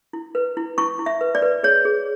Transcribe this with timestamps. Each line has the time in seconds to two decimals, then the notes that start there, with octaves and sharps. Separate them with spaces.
0.13 E4
0.35 B4
0.57 E4
0.78 E4 C#6
0.99 E4
1.06 E5
1.21 B4
1.35 D5
1.42 B4
1.63 G#4 C#5
1.85 G#4